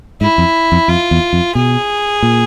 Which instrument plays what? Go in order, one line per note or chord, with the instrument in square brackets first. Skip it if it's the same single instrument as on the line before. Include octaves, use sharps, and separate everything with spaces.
[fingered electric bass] G#2 [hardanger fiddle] E4
[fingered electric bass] F2
F2
[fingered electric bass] F2 [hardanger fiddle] F4
[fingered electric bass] E2
F2
[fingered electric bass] B2 [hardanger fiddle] G#4
[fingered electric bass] A#2